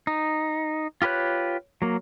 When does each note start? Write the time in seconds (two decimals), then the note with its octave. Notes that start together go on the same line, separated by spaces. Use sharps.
0.07 D#4
1.02 F4 G4 B4 C#5 F#6
1.82 F#3 A#3